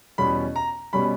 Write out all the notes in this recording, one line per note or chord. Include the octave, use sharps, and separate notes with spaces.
E2 B2 G3 C#4 B5
A#5
B2 G3 C#4 B5